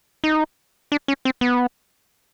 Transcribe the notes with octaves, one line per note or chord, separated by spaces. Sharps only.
D#4
D4
C#4
C4
B3